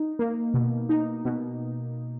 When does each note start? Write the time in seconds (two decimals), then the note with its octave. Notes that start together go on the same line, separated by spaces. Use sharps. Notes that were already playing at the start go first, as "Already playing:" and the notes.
Already playing: D#4
0.19 A#3
0.54 B2
0.89 D#4
1.25 B2